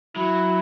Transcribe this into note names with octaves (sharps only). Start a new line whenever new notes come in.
F#3 E4